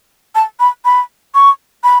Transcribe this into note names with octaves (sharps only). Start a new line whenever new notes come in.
A5
B5
B5
C#6
B5